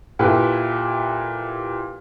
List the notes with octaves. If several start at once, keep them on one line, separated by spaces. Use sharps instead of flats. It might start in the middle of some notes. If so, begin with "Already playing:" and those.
A#2 E4 G4 A4 B4